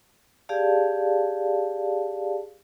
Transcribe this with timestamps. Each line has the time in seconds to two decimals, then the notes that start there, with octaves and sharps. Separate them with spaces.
0.49 G4 G#4 D5 F5 A5